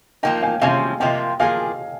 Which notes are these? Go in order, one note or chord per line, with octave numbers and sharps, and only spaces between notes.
F3 A#3 D#4 D#5 G5
F5 G#5
C3 F3 G#3 C#4 F5 G#5
C3 F3 A#3 F4 D#5 G5
F3 A#3 F4 G#4 F5 G#5